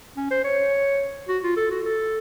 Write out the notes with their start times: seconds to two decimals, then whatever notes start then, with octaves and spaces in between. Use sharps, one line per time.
0.17 C#4
0.31 C5
0.44 C#5
1.28 F#4
1.43 F4
1.57 A4
1.70 F#4
1.85 A4